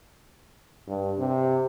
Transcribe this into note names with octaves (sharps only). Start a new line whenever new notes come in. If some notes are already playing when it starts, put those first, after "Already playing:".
G2
C3